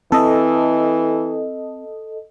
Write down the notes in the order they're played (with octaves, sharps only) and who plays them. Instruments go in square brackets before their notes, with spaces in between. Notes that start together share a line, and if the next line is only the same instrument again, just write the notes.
[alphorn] E3 [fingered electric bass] C4 [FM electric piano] A4 D#5